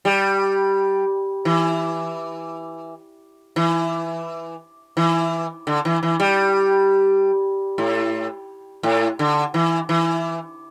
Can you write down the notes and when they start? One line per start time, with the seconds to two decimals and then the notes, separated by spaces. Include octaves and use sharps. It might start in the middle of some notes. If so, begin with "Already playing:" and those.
0.05 G3
1.45 E3
3.56 E3
4.97 E3
5.67 D3
5.85 E3
6.03 E3
6.20 G3
7.78 A2
8.83 A2
9.19 D3
9.54 E3
9.89 E3